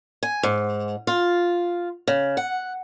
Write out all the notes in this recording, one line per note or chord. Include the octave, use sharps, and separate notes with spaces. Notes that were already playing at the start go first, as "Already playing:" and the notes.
G#5
G#2
F4
C#3
F#5